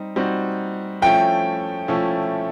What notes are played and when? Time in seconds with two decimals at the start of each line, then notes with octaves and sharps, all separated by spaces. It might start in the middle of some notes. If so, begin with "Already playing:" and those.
Already playing: G3 C4 D#4
0.16 G3 C4 D#4 F#4
1.02 F3 A3 C#4 E4 G5
1.88 F3 A3 C#4 E4